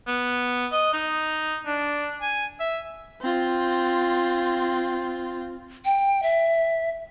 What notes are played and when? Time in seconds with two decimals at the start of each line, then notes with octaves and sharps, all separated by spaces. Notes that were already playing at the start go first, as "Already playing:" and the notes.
0.07 B3
0.72 D#5
0.93 D#4
1.66 D4
2.22 G#5
2.60 E5
3.22 C4 F4
5.85 G5
6.23 E5